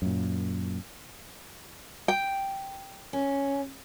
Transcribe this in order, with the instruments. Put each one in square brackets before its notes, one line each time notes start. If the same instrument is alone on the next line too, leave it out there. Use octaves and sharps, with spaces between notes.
[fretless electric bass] F#2 A#2
[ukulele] G5
[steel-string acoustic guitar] C#4